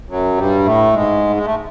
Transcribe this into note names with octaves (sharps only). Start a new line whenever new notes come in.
F#2 F#3
G2 G3
A2 A3
G#2 G#3
G#3
A3